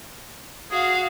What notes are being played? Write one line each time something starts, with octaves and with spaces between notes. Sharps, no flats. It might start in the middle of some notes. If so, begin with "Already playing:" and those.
F#4 G#4 F5